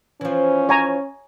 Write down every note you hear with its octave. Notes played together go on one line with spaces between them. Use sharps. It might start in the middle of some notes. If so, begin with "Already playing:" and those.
E3 F3 C#4
C#5 G#5 A#5